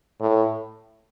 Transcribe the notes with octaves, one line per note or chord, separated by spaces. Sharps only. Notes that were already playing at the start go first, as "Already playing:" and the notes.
A2